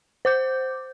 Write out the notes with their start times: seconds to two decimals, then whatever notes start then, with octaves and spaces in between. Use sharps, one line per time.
0.25 C5 D6 G6